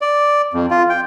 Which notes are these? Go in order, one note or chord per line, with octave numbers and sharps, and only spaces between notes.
D5
F2
F4
G5